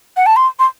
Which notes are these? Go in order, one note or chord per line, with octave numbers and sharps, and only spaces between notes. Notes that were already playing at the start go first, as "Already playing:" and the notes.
F#5
A5
C6
C6